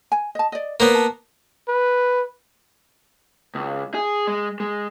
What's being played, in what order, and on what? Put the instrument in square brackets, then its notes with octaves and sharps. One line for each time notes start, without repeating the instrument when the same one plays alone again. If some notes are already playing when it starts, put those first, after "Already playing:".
[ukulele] G#5
D#5 A5
D5 D#5
[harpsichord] A#3 B3 [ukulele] C5 C#5
[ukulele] A5
[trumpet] B4
[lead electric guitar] C#2
G#4
G#3
G#3